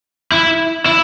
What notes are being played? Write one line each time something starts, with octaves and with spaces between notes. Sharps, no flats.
E4
E4